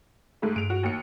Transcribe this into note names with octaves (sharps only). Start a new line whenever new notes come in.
G#2 A3
G2 D7 F7
F#4
D#2 C#7